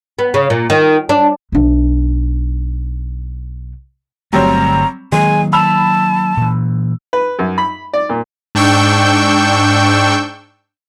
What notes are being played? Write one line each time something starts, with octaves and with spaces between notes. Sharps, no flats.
B3
C#3
A#2
D#3
D4
B1 D4
G1 D3 F#3 G3 A3 C4 A#5
D#3 F#3 G#3 A#3 G#5
A5 B5 E6 F7
A#2 E3
B4
F#2
B5
D5
A#2
G#2 D4 G5 C#6 E6 G6